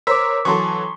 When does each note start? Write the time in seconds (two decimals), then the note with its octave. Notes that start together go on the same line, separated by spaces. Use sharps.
0.07 A#4 C5 C#5 D6 E6 B6
0.45 E3 F#3 A4 C6 C#6